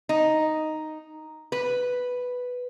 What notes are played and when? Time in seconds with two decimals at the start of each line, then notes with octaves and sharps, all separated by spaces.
0.09 D#4
1.52 B4